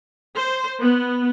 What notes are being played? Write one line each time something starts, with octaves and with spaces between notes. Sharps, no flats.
C5
B3